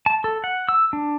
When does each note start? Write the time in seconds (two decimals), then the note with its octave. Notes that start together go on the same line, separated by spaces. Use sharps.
0.06 A5
0.24 A4
0.44 F#5
0.69 E6
0.93 D4